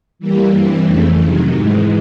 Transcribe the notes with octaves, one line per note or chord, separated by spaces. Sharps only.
E3 G3 A#3
G2 E3 G3 C4
F2 C#3 E3 A3
C3 D#3 F#3
G#2 E3 G#3